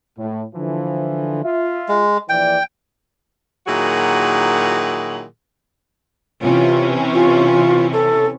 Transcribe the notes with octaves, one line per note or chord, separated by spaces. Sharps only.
A2
D3 E3 F3
F4 E5
G#3
A#1 E3 D5 G5
A#2 D#3 F#3 E4 F#4 G#4
C3 E3 C#4 F4
F4
A4